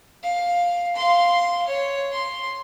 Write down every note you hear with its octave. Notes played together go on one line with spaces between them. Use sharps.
F5
F5 C6
C#5
C6